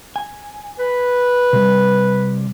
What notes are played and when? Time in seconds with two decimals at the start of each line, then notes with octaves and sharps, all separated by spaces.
0.16 G#5
0.79 B4
1.53 C3 G3